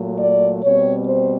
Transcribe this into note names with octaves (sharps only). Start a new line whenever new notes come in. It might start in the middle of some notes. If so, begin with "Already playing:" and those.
Already playing: A#2 F#3 A3
D5
B2 G3 C4 C#5
C5